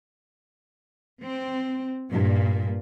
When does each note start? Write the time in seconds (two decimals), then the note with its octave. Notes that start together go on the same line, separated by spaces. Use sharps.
1.22 C4
2.10 G2 A#2